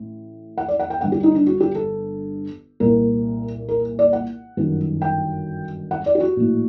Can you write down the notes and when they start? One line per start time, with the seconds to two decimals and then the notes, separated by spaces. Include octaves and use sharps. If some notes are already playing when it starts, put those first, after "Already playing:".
Already playing: A1 A2
0.58 F#5
0.68 D5
0.79 F#5
0.90 G5
1.01 G1 G2 D3 F#5
1.12 G4
1.23 D#4
1.35 D4
1.47 F#4
1.60 G4
1.75 A4
2.80 C2 A#2 A#4
3.69 A#4
3.99 D5
4.13 F#5
4.57 G1 F#2 D#3
5.02 G5
5.91 F#5
6.06 D5
6.15 G4
6.20 F#4
6.36 A#1 A2